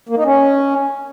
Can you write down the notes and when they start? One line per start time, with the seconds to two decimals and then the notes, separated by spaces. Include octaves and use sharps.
0.09 A#3
0.17 D#4
0.25 C#4